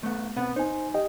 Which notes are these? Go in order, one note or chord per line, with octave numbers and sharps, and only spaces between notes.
A3 B3
B2 B3 C4 B4 F#5
D#4 C5 G#5
G4 D#5 G5